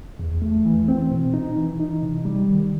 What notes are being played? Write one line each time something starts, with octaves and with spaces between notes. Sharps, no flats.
E2
A3
E3
C4
B2
D#4
E3
D#4
C3
G3
D#3